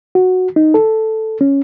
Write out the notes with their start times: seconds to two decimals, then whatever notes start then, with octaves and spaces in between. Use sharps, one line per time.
0.15 F#4
0.56 D#4
0.74 A4
1.41 C#4